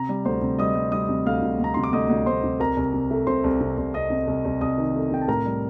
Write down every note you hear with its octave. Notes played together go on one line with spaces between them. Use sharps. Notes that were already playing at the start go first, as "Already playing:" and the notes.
Already playing: C3 A#5
G3
D2 C5 C6
C3
G3 D#5 D#6
G3
G3 D#5 D#6
C3
D2 F5 F6
C3
D2 A#5
C3 C6
D6
D2 D#5 D#6
D2
D2 C5 C6
C3
C2 A#4 A#5
C2
C3
A3
C3 C5 C6
C2
C3
C2
C2 D#5 D#6
C3
C2
C2
C2 D#5 D#6
D#3
A3
C3 G5
A5
A2 A#4 A#5
G3